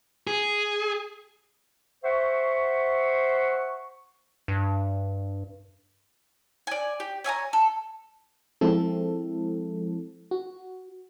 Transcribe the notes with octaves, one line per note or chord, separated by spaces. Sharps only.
G#4
C5 E5 F#5 C#6
G2
D5 G#5
G4
C#5 E5 G#5 A#5
A4
F3 G#3 C4 E4 A4
F#4